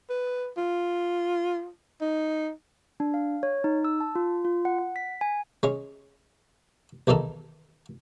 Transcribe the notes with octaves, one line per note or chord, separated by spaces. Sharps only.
B4
F4
D#4
D4
F5
C#5
D#4
E6
A5
F4
F4
F#5
F#5
B6
G#5
G#3 C#4
B1 E2 D#3 D#4 A4